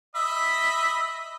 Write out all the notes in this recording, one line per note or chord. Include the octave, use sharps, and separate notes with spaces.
D#5 E5 B5